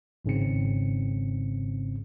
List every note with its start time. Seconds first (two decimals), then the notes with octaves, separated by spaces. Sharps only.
0.25 G#1 G#2 C#3 C4 C#7